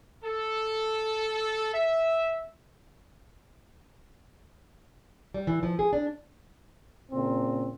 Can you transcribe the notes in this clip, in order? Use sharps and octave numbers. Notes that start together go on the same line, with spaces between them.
A4
E5
G3
E3
F3
G#4
D4
A#2 C#3 C4